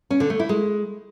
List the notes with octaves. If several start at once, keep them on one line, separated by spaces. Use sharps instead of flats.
C#4
D3
A3
E4
G#3